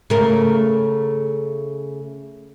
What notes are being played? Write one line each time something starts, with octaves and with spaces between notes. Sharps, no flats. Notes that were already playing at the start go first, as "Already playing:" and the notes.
C#3 A3 A#4